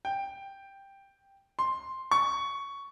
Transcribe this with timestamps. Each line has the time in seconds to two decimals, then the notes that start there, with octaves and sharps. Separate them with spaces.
0.05 G5
1.59 C6
2.11 C#6